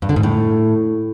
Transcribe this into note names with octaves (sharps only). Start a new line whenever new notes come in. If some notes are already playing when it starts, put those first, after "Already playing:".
G2
D3
G#2
A2